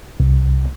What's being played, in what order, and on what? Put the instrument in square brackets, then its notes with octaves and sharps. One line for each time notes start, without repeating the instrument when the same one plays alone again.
[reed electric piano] C2